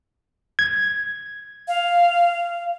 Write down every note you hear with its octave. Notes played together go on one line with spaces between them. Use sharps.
G#6
F5